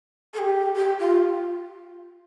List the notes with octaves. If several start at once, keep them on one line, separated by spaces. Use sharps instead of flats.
A4
G4
G4
F4